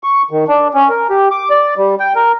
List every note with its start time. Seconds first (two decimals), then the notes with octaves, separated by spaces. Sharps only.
0.03 C#6
0.31 D#3
0.48 D4
0.74 C#4
0.89 A#4
1.10 G4
1.31 D6
1.50 D5
1.77 G3
2.00 G5
2.16 A#4